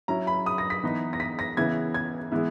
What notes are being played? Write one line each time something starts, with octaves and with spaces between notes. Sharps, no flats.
F#3 C#4 E4 A#5
B5
D#6
A#6
B6
E3 B3 D#4
A#6
B6
A#6
C#3 E3 B3 E4 G#6
G#6
E3 G#3 B3 E4